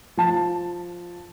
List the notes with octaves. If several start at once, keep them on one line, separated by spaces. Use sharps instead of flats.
F3 A5